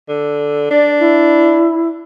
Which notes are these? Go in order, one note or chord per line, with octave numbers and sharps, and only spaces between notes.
D3
D4 D5
E4